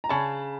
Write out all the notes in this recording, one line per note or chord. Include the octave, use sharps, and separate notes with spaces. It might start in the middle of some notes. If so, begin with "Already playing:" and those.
A#5
C#3 A5 B5